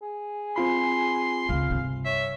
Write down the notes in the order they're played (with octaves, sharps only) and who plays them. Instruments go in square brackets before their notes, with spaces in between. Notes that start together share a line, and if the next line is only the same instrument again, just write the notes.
[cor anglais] G#4
[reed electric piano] C4 F4 B5 [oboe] C6
[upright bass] C#2 C#3 [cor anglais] F5
[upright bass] G2 C3
[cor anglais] C#5 [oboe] E5